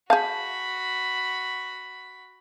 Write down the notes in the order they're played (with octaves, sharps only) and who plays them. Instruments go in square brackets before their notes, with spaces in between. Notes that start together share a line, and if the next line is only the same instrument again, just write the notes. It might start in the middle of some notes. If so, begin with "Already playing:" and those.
[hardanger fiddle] F#4 B5 [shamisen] G#4 F5 [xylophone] A5 G6